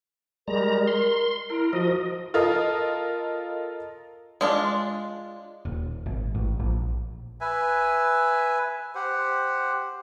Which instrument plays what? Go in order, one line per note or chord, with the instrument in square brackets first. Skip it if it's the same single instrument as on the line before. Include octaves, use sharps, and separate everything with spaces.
[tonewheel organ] G3 G#3 A#5 [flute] A#4
[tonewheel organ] C6
[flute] E4 [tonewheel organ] A#4
[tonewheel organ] F3 D#5 [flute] F#4
[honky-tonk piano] F4 A4 A#4 D#5
[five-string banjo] G#3 D4 F4
[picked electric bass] D#1
G#1
A1
A#1
[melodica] B4 E5 G#5
G4 C5 F#5